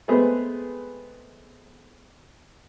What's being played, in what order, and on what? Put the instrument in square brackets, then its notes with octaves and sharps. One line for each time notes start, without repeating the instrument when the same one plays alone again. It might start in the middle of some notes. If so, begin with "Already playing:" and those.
[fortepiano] G#3 A3 B3 C4 G#4 B4